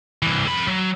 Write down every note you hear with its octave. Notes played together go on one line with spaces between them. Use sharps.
C2 E3
F2 B5
F#3